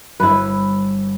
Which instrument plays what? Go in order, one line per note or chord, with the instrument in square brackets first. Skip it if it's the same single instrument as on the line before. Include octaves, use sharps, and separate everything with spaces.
[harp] G1 [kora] E4 B4